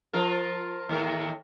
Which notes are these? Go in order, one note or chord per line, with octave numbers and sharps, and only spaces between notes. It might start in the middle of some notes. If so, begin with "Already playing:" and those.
F3 F4 A#4
D#2 A2 A#4